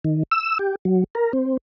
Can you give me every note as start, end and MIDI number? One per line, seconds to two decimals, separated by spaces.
0.04 0.23 51
0.31 0.58 88
0.59 0.75 67
0.85 1.04 54
1.15 1.32 70
1.33 1.57 60